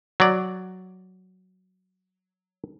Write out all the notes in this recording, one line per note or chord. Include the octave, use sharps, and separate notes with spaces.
F#3 D5